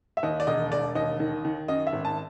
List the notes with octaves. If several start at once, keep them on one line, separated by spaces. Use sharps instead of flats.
E5
D#2 D#5
D5
E1 D#5
E1 D5
D#2 D#5
D#3
D#3
F#2 D#5
E5
G#1
A5